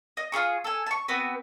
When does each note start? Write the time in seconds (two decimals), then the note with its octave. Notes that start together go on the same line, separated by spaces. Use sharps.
0.17 D#5
0.32 F4 G4 G#4 C#6
0.64 A4 G#5
0.86 A5 C#6
1.08 B3 C4 F#4 B4